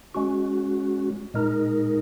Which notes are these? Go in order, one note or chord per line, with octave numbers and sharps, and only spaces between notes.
G#3 C#4 F#4
A#2 G#3 D#4 A#4